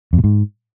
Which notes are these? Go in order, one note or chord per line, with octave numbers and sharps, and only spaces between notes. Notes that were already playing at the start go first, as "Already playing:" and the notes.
F2
B2
G#2